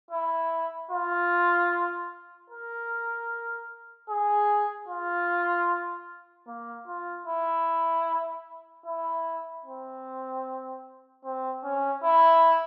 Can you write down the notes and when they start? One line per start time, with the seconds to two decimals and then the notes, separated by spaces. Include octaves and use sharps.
0.11 E4
0.91 F4
2.50 A#4
4.09 G#4
4.88 F4
6.48 A#3
6.87 F4
7.26 E4
8.86 E4
9.65 C4
11.24 C4
11.64 C#4
12.03 E4